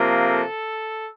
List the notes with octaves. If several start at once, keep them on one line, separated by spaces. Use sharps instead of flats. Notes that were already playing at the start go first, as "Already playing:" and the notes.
Already playing: C3 F3 A#3
A4